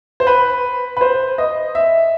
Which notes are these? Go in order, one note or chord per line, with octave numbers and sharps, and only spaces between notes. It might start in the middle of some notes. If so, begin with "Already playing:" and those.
C5
B4
B4
C5
D#5
E5